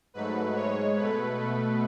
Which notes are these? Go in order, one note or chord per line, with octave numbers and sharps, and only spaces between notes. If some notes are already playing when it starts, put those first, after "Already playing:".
G#2 F#3 A3 B4
G#2 G#3 C#5
B2 A3 B4
B2 A3